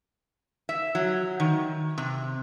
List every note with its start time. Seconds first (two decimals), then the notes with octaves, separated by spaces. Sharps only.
0.69 E5
0.95 F#3
1.40 D#3
1.98 C3